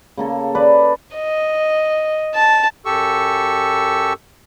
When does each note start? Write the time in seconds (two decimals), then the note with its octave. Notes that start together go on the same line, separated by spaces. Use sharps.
0.17 C#3 A#3 A4
0.55 B4 D5
1.16 D#5
2.35 A5
2.85 F#2 G4 A4 C#6 E6